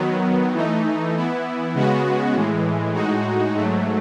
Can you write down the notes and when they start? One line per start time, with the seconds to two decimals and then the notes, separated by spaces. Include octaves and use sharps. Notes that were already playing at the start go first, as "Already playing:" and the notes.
Already playing: D#3 F#3 B3
0.53 E3 A3 D#4
1.14 E3 B3 E4
1.74 C#3 G#3 B3 F#4
2.34 A2 E3 G#3
2.94 A2 G#3 D#4 F#4
3.55 G#2 F#3 A3